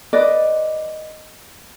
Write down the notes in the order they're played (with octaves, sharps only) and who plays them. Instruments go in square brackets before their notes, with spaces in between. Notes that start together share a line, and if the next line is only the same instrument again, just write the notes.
[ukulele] B4 D5 D#5